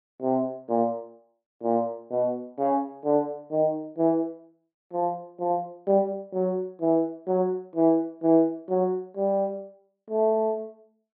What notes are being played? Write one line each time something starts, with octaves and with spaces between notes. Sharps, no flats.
C3
A#2
A#2
B2
C#3
D3
D#3
E3
F3
F3
G3
F#3
E3
F#3
E3
E3
F#3
G3
A3